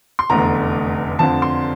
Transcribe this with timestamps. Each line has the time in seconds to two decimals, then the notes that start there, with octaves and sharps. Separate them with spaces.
0.19 C6
0.30 F1 E2 D3 A3 A#5
1.19 F2 D3 F3 A5
1.42 C6